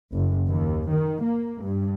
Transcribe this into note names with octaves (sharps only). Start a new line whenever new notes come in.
F#1
D#2
D#3
A#3
G2